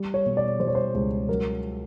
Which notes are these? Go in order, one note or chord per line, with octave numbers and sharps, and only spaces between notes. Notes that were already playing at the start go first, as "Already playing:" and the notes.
Already playing: G3
C#5
B2
D5
G3 C5
C#5
C5
C#2
F#3 A#4